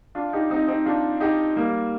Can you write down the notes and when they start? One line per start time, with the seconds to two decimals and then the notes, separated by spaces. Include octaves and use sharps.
0.15 D4 F4
0.33 D#4 G4
0.50 C4 D#4
0.68 C4 D#4
0.85 D4 F4
1.20 D#4 G4
1.56 G3 A#3